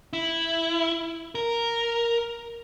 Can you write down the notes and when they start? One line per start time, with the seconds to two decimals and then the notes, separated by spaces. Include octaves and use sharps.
0.13 E4
1.35 A#4